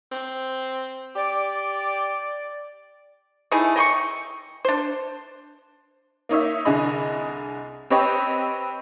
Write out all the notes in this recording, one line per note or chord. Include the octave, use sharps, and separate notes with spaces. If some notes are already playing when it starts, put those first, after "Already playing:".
C4
G4 D5
A3 D#4 E4 G#4
D#5 G5 C6 C#6
D4 C5
A#3 D#4 C#5 E5
C2 D3 G#4 D#5 B5
C4 G4 B4 C#5 D#5 G5